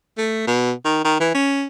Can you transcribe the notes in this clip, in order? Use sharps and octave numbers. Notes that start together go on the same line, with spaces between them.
A3
B2
D#3
D#3
E3
C#4